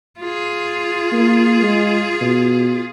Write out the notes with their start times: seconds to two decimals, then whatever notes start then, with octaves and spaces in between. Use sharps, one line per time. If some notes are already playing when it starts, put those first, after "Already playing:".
0.20 F4 G#4
1.12 A#3
1.62 G#3
2.21 B2